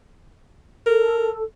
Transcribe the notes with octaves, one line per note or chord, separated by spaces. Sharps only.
A4 A#4